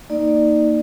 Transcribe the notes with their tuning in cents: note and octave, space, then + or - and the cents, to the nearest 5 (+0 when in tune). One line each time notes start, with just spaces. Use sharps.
A#3 +0 D#4 +0 D5 +20